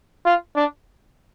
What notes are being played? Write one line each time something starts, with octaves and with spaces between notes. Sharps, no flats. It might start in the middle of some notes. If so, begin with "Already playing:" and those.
F4
D4